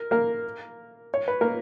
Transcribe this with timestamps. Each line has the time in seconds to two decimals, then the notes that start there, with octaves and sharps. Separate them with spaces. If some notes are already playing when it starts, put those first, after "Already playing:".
Already playing: A#4
0.11 A#3 A#4
1.14 C#5
1.28 B4
1.41 A#3 A#4